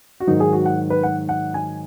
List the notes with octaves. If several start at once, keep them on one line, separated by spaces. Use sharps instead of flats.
F#4
G#2 D#3 F#3 D#4
G#4
F#4
F#5
B4
F#5
F#5
G#5